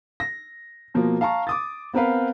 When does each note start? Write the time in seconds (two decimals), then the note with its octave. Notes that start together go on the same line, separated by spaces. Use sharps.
0.20 A#6
0.94 B2 F3 A#3
1.21 F5 A5 A#5 C#6
1.47 D6 D#6 A6
1.94 B3 C4 A#4 B4 F5